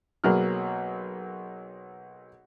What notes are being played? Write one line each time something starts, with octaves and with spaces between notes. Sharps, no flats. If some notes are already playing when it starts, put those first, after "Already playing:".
B1 B2 F#3 A#3 G#4 F6